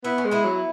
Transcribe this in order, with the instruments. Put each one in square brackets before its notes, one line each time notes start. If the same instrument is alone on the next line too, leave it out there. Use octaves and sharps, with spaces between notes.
[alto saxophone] B3 [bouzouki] E4
[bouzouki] C#4
[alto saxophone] G#3
[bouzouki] B3 E4
[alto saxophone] F#3